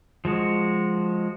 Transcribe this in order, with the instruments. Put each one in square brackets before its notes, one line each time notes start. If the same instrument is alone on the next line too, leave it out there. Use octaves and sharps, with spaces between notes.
[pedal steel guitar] F3 G#3 F#4